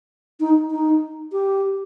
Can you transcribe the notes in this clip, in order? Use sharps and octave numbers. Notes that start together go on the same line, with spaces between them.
D#4
D#4
G4